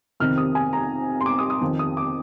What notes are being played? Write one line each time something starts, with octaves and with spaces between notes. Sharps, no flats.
F2 C3 D#3 F6
D#6
G#5
A#5
C6
D6
D#6
D#6
F2 D#3
D#6
D6